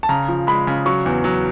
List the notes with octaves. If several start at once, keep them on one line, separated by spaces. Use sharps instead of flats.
A5
C#3 A#5
F3
G#3 B5
C#3
F#3 C#6
E2
F#3